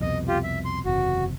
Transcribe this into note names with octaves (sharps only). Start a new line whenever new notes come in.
C2 F2 B2 D#5
F4 G4
E5
C6
F#1 E2 C3 F#4